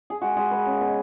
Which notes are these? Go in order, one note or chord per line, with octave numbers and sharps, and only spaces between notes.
G#4
G#3 F#4
G#3 G#4
G#3 B4
C#3
B2